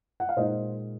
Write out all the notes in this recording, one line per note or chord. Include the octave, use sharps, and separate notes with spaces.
F#5
F5
A#2 G#3 D#4 C5 D#5